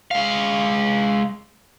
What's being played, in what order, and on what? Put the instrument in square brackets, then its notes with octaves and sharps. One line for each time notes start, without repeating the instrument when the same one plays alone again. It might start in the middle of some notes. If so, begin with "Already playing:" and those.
[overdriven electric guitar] G#3 F5